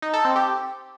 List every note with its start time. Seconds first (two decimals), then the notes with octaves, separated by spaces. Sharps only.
0.02 D#4
0.14 A4
0.25 C4
0.36 G4